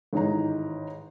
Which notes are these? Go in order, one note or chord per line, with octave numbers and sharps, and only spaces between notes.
A1 G#2 D#3 D#4 G#4 A#5